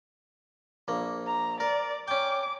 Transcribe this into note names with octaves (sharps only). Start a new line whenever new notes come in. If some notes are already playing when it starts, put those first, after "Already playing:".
A#1 A#3
A#5
A#4 D5
C#4 G5 D6